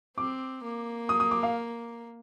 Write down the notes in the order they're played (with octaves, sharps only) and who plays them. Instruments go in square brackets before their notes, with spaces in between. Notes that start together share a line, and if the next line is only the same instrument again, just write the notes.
[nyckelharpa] C4 [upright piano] D6
[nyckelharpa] A#3
[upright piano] D#6
D#6
D6
F5